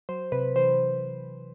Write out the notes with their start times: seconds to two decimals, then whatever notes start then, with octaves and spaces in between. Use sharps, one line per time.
0.09 F#3 C5
0.32 C3 B4
0.55 E3 C5